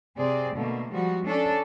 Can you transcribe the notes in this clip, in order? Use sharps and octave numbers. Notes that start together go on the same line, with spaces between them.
C3 C4 G#4 D5
B2 D3 A3 A#3
F3 G3 G#3 F#4
C#4 D4 A4